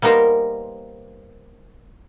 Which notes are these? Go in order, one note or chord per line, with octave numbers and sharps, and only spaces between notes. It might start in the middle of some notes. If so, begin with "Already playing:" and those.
G3 A#3 B3 D#4 A#4 C5